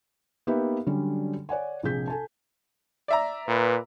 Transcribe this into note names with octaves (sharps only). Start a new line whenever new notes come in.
A#3 B3 D#4 G4 B4 E5
D3 F#3 G3 C#4 D4
C#5 D5 F#5 G#5
A#1 C3 G#4 G6 B6
A4 G#5 A5
D5 E5 A#5
A#2 B4